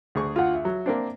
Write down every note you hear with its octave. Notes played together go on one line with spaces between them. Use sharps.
D2 G#4 C#6
F4 F#5
E5
F#3
A#3 C4 D4